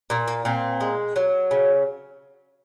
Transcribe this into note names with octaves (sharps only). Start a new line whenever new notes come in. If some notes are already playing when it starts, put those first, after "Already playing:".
A#2 A#3
A#3
A#2 C4
G#3
F#3
C#3